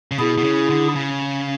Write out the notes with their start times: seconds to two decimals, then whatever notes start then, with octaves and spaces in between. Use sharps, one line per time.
0.11 C#3
0.19 B2 E4 G#4
0.38 B2
0.44 C#3
0.70 D3
0.96 C#3